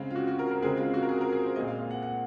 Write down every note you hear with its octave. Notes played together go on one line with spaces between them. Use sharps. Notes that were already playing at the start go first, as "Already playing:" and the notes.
Already playing: C#3 G#3 C4 F5
F4
F#4
F#4
A#4
A#4
C#3 G#3 C4 G#4
F4
F#4
A#4
G#4
A#4
G#4
C5
A#2 G#3 C4 D#5
F5
F5
F#5
F#5